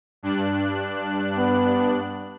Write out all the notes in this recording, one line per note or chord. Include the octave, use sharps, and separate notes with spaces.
G2 D4 F#6
B3